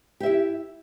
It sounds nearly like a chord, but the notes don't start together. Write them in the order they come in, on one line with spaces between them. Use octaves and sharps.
G4 E5 E4